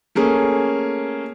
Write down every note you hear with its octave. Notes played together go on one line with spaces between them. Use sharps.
A3 A#3 C#4 G#4